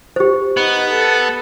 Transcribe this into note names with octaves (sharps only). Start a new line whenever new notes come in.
G4 C5
B3 D#4
A4